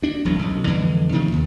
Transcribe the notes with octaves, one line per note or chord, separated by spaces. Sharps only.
D2 D4
E1 C2 F#3
B1 F#2
F2 D3 E3 G#3
C3 D#3 F3 A#3
D#2